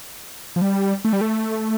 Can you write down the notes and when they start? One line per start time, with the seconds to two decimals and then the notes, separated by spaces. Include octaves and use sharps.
0.56 F3
0.62 G3
1.05 A3
1.13 G3
1.21 A3